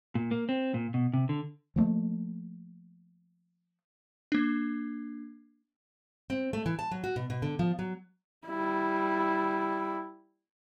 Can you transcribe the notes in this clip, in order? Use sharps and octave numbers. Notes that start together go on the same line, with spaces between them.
A#2
A#3
C4
A#2
B2
C3
D3
F3 F#3 A3 A#3
A#3 D4
C4
A3
E3
A5
F#3
F#4
B2
B2
D3
F3
F#3
G3 E4